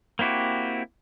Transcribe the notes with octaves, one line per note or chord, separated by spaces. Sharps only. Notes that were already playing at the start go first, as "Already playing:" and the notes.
A#3 C4 E4 F#4 G4